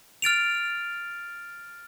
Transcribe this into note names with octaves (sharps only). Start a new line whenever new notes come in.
F6 A6 D7 F7